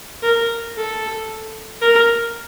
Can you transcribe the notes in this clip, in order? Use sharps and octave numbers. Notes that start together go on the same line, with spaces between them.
A#4
A4
A#4